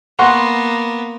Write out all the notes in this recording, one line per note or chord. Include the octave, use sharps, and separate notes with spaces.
A#3 B3 F#5 C6 C#6